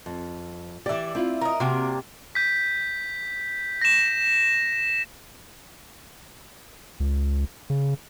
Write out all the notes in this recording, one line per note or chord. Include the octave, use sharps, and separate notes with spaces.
F2
E3 G4 D5 E5
C4 E4 F4
A#4 D#5
C3 A#3 D4 F#4
G6 B6
A#6 E7
C#2
C#3